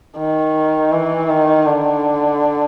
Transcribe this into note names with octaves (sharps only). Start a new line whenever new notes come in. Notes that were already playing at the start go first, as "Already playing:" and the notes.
D#3
E3
D#3
D3